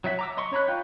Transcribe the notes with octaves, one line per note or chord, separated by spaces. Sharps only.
F#3 D#4 E5 F#5
A#5 D6 E6
D#5 C6 C#6
C#4 C#5 A#5 B5 F#6
D#4 F4 F5 G5 G6